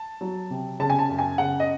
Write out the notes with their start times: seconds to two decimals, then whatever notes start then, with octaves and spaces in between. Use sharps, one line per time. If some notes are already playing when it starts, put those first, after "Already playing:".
Already playing: A5
0.21 F#3
0.50 C3
0.80 C#3 A5
0.90 G#5
0.99 A5
1.09 F#2
1.19 G#5
1.38 C#3 F#5
1.60 D#5